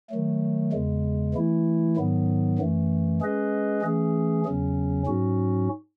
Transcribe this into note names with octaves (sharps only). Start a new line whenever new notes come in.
D#3 F#3 A3
E2 C#3 G#3
E3 A3 E4
G#2 D#3 F#3 B3
F#2 E3 A3
G#3 C#4 G#4 B4 D#5
E3 A3 C#4 G#4
E2 C#3 F#3 C#4
G#2 F#3 C#4 F#4